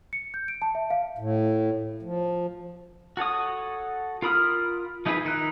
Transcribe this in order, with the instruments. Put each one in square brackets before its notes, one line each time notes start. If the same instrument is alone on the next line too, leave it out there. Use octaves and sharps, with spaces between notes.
[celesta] C#7
G6
D7
A5
E5
F5
[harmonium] A2
F3
[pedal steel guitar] F#4 A4 C#5 D#6
F4 A#4 B5 D#6 F6
F3 D#4 E4 G#4 B4
D#3 D#4 E4 F#6